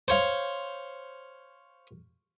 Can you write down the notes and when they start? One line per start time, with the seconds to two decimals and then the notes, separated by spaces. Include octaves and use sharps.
0.08 C5 C#5 F5